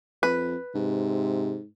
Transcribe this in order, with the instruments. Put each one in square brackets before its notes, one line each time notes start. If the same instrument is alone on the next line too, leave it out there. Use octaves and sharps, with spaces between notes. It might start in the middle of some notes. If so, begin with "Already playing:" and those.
[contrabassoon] F2 [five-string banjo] B4
[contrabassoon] G#2 [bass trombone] C3